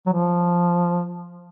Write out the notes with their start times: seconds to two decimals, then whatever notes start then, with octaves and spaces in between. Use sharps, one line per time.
0.06 F#3
0.13 F3